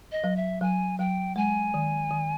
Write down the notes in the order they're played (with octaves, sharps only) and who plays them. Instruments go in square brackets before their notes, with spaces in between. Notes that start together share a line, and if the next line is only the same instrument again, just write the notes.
[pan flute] D#5
[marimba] F#3
[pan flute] E5
[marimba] F#3 [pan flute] G#5
[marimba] F#3 [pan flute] G5
[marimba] G#3 [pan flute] G#5
[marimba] D#3
D#3